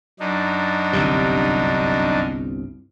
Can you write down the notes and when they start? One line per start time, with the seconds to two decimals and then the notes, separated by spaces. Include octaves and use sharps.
0.20 F#2 D4 D#4
0.93 G1 C2 C3